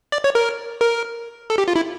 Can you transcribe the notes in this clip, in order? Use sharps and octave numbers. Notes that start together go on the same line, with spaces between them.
D5
C#5
A#4
A#4
A4
G4
F4
E4